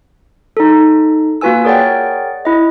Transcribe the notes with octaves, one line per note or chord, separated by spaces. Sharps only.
D#4 A4
A#3 F4 F#4 B4 G#5 E6
G#4 A#4 C#5 D5 F#5 G5
E4 D#5